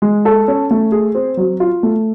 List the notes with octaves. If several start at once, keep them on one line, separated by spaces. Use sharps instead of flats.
G#3
A4
C#4
A3
G#4
C4
F#3
F4
A3